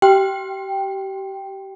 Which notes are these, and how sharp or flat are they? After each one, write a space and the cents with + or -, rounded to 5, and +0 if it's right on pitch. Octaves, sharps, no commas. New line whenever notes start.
G4 -30 G5 +0